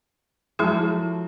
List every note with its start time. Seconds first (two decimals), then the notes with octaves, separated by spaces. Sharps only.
0.59 F3 F#3 G#3 E4 G#4 A4